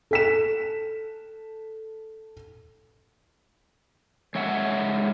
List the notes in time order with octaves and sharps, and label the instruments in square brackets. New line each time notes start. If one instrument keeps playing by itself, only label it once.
[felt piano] A4 B6 E7
[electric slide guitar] G#3 C#5 E5 F#5